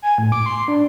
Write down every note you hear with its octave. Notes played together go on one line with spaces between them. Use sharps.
G#5
A2
D6
C6
D4